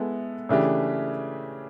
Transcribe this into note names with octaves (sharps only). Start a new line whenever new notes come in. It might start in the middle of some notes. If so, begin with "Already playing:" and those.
Already playing: G#3 B3 E4 A4
C#3 E3 A3 D4 G4